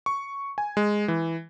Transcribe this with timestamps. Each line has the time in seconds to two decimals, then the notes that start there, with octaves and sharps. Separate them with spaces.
0.06 C#6
0.58 G#5
0.77 G#3
1.08 E3